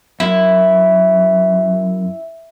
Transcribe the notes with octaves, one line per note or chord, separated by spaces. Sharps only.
F#2 E4